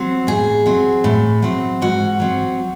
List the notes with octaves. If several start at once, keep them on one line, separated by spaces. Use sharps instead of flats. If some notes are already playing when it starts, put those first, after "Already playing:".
Already playing: F#3 C4
A2 G#4
F#3 C4
A2
F#3 C4
G#2 F#4
F#3 C4